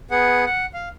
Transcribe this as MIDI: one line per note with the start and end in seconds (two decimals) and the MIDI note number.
0.11 0.45 59
0.11 0.45 68
0.11 0.45 78
0.46 0.66 78
0.74 0.89 77